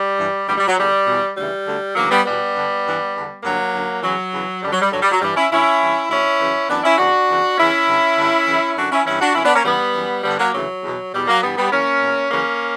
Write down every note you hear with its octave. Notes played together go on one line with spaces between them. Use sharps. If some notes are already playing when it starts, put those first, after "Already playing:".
Already playing: G3
G2 E3
D2 C#3 E3 G3
G3
F#3
E2 D3 G3
E2 B2
D2 C#3 E3 G3
D2 D3
D2 C#3 E3 F#3 A#3
G3 B3
E2 B2 G3 B3
G2 D3
G2 E3
E2 D3
G2 D3 F#3 A#3
F#2 D3
E2 C#3 E3 F#3
E2 C#3 E3
F#2 D3 G3
F#3
G3
G2 D3 F#3
G3
F#3
G2 E3 G3
C#4 E4
D2 D3 C#4 E4
G2 E3
D2 D3 C#4 E4
F#2 C#3 E3
F#2 E3 B3 D4
C#4 E4
E2 C#3 E3 D4 F#4
E2 C#3 E3
E2 C#3 E3 C#4 E4
G2 D3
G2 D3
F#2 C#3 E3
F#2 D3 D4 F#4
C#4 E4
G2 E3 C#4 E4
D4 F#4
F#2 D3 C#4 E4
B3 D4
A#3 C#4
E2 C#3 E3 G3 B3
F#2 E3
G2 D3 G3 B3
F#3 A#3
D2 C#3 E3 F#3
E2 B2
E2 B2 G3
F#3 A#3
G2 E3 G3 B3
G3 B3
F#2 E3 A#3 C#4
E2 B2
F#2 C#3 E3 A#3 C#4